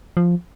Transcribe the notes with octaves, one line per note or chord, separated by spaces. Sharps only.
F3